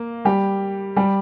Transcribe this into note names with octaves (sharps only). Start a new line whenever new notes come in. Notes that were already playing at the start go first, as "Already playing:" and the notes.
Already playing: A#3
G3 G4
G3 G4